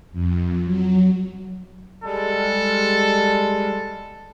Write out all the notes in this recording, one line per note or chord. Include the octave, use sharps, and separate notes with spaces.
F2
F#3
G3 G#3 A4